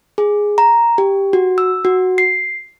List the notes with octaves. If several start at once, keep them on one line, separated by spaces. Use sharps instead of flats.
G#4
A#5
G4
F#4
E6
F#4
C7